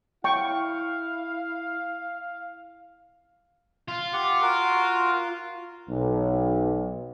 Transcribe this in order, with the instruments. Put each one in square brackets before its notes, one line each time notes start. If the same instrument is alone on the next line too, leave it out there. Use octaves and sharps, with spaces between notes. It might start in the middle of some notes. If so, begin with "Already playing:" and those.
[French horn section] E4 [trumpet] F5 [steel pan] G5 C#6
[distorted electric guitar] F4
[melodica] G4 F#5
F#4 A#4
[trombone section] B1